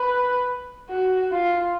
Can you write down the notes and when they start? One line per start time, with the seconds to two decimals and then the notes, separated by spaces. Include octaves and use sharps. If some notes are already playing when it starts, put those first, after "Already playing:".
Already playing: B4
0.90 F#4
1.32 F4